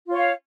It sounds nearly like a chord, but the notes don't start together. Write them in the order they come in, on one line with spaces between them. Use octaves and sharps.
F4 C#5 F5